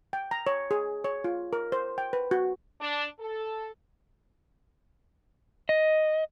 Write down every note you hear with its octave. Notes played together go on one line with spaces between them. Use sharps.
G5
A#5
C#5
G#4
C#5
F4
A#4
C5
G5
B4
F#4
D4
A4
D#5